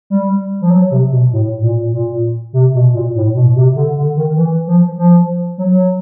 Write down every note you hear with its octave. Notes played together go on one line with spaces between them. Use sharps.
G3
F3
F#3
C3
B2
A2
A#2
A#2
C3
B2
A#2
A2
B2
C3
D3
D3
D#3
E3
F3
F3
F#3